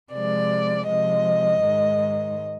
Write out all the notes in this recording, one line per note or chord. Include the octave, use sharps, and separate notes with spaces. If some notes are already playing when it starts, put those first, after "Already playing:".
C3 F3 G#3 D5
C3 F3 G#3 D#5
G#2 D#3 G#3